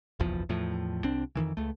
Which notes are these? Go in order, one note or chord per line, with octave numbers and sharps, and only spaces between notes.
F#1 B1 E2 F3
E2 A2 F3
C2 C4 D4
F2 A#2 D#3 E3
C#2 A3